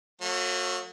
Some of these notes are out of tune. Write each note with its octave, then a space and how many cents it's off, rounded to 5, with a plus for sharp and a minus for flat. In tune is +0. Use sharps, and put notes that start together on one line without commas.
F#3 -30 A3 +40